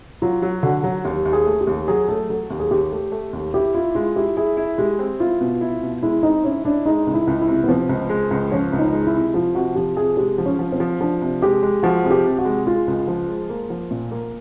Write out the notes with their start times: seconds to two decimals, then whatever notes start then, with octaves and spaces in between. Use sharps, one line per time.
0.22 F#3 F4
0.42 F#3 F#4
0.63 D3 F#4
0.84 F#3 F#4
1.05 D#2 G4
1.25 D#2
1.33 G#4
1.46 A3
1.61 G4
1.67 D#2
1.88 F#3 G#4
2.08 A3 A4
2.30 F#3 A4
2.50 D#2
2.59 G#4
2.71 D#2 G4
2.92 A3
3.12 A3
3.33 D#2
3.54 E4 G4
3.74 E4 F4
3.95 G#3 F4
4.16 E4 G4
4.37 E4 G#4
4.57 E4
4.78 G#3 G4
4.99 C4
5.20 E4 F4
5.41 B2
5.61 E4
5.82 B2
6.03 G#3 E4
6.23 C4 D#4
6.44 C#4 E4
6.64 D4 E4
6.86 G#3 D#4
7.07 C#2
7.14 E4
7.27 C#2
7.41 E4
7.48 C3
7.64 B3
7.69 F3 C4
7.89 C#2
8.09 G#3
8.31 C#2
8.52 F3 C#4
8.73 C#2
8.79 D#4
8.93 G#3
9.07 E4
9.14 C3
9.34 F3 F4
9.55 C3 F#4
9.76 F3 G4
9.97 C3 G#4
10.17 G#3 G4
10.38 F3
10.46 C#4
10.59 F3
10.72 C4
10.80 F3
11.00 F3 D4
11.21 C3
11.42 G#3 G4
11.63 G#3
11.83 F3 F#4
12.04 C3 G#4
12.11 G4
12.25 C3
12.39 F#4
12.45 G#3
12.66 G#3 F4
12.88 C#2
13.08 F3
13.28 G#3
13.49 A#3
13.70 F3
13.91 A#2
14.11 A#3